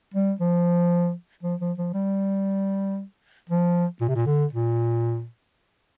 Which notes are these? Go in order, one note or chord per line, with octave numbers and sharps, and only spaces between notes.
G3
F3
F3
F3
F3
G3
F3
A#2
C3
A#2
D3
A#2